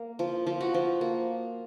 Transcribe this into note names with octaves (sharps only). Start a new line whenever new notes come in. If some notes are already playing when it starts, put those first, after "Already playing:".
Already playing: A#3 A#4
F3
F3
F#4
F3
A#3